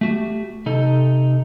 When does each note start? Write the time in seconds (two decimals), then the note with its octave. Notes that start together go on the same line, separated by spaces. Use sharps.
0.01 A3 F#4 G4
0.66 C3 D#4 A4